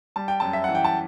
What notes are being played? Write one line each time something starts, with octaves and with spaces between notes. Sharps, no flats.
G3 A5
G5
F#2 A5
E5
E3 F#5
G5
A5